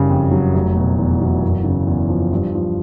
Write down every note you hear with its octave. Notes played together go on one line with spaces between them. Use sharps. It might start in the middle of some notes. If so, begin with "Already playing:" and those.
Already playing: F#1 C#3 G3
F2
F#3
F1
B2
E2
F#3
F#1
C#3
E2
F3
G2
F3